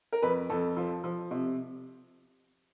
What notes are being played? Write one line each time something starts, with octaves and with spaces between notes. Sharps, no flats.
A#4
F2 B4
F2 A4
F3
F3
C3